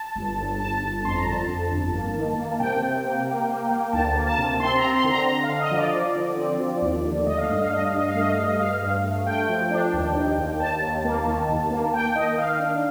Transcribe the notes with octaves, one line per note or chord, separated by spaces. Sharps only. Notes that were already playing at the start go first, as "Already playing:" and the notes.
Already playing: A5
G1
G1
G1 A5
G1
F2 C6
A#5
D3 A5
F2
G1
A#3
D#3
A#3
C3 G5
C3
A#3
A#3
A#3
A#3
D2 A5
A#3
A5
C3
C4 C6
A#5
C4
C6
D3
A#5
D3 A#5
F5
D3
D#5
F3
D5
F3
D3
C4
F3
D#2
D3
A3 D#5
F5
G2 D#5
F5
D4 D#5
F5
G2 D#5
F5
A3 D#5
F5
G2
D#5
G2 F5
G2
A3
A3 G5
F3
D4
D#2
D#3
D#2
D#2 A5
D#2
A#3
D#3
D#2
A#3
A#3 G5
D#3 D#5
D#3 F5
D4